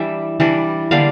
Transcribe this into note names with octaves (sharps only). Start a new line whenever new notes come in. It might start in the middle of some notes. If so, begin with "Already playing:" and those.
Already playing: E3 G3 D4 E5
E3 G3 D4
D3 G3 A#3 D4 F5